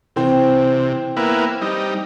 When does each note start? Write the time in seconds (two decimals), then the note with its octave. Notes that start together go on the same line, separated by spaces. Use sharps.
0.16 C3 E3 C4
1.17 A#3 B3 E4
1.61 G3 D#4